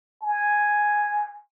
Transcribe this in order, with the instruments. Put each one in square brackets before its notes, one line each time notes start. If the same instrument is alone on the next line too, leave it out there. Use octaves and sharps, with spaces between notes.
[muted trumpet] G#5